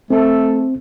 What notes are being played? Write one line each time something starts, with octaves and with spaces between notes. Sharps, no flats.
A3 C4 A4